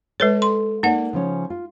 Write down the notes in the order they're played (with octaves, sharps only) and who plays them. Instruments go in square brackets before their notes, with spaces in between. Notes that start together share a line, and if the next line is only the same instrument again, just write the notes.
[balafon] G#3 B4 C#5 [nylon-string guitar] A4
[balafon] C6
[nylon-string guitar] A#3 D5 [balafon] D#4 F#5
[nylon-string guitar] C#3 F3 C#4
F4